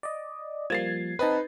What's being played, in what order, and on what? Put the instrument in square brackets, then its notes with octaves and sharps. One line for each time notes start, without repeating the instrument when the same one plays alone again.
[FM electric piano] D5 D#5
[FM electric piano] F3 G3 A#3 [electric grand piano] G#6 A6 C7
[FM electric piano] C4 D#5 A5 [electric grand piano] D#4 B4